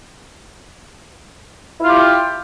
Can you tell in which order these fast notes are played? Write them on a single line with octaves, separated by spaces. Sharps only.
E4 F4 G4